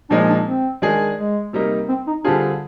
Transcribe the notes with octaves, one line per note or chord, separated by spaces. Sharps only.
A#2 F3 G#3 D4 D#4
D4
C4
D#3 G#3 D4 G#4
G#3
C3 G3 A#3 D#4
C4
D#4
D3 G3 C4 D4 F4 G#4